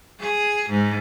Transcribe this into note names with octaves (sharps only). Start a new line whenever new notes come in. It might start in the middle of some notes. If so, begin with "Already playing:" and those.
G#4
G#2